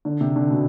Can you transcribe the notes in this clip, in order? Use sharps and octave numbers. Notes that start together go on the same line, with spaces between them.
D3
C3
D3
B2